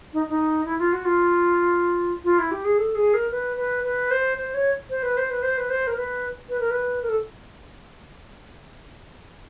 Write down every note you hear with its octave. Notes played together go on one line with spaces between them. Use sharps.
D#4
D#4
E4
F4
F#4
F4
F4
E4
G4
G#4
A4
G#4
A#4
B4
B4
B4
C5
C5
C#5
C5
B4
C5
B4
C5
B4
C5
A#4
B4
B4
A#4
B4
A#4
A4